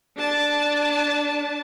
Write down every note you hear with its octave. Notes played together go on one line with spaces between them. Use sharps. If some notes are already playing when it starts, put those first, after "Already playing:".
D4 A5